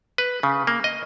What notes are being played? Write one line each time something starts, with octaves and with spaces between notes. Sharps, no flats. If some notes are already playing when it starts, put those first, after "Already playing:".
B4
C#3
A#3
D#5